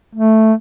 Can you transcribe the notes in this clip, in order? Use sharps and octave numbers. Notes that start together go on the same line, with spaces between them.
A3